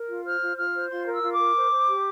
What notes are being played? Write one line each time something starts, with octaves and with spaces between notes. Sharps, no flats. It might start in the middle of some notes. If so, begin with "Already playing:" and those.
Already playing: A#4
F4
C5 F6
F4
F4 F6
C5
F4 C6
A#4
E6
F4
D6
A#4
C5
C5
G4